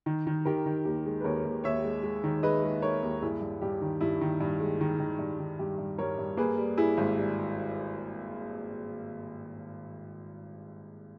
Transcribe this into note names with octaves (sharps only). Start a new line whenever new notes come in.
D#3
D#3
D#3 G4 A#4
D#3
D#2 G4
G#3
B4
D#2 A#4 C#5
D#2
D#2 C#5 E5
G#3
G#3
D#3
G#3 B4 D#5
G#3
G#3 A#4 C#5
D#2
G2 E4 G#4
G2
G2 G4
D#3
G2 E4
D#3
G2
G#3
D#3
D#3
G2
D#3
G2 G4
G2
G2 A#4 C#5
G2
A#3 G#4 B4
G3
G3 E4 G#4
G#1
G3